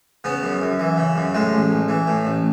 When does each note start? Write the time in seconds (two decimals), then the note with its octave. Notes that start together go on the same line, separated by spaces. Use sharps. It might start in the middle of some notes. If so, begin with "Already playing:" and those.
0.24 C#3 B3
0.43 F#2
0.61 F#2
0.79 E3
0.97 C#3
1.16 F#2
1.35 A2 G#3
1.53 A1
1.71 A1
1.89 E3
2.07 A2
2.25 A1